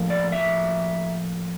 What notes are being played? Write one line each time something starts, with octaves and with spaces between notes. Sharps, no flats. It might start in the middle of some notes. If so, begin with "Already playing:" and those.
Already playing: A2 F3 A#3
D5
E5